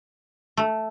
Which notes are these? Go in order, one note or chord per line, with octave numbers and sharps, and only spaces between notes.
A3